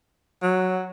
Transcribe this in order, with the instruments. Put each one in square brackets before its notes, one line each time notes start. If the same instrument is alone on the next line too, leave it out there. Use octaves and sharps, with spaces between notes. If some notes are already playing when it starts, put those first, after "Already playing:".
[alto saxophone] F#3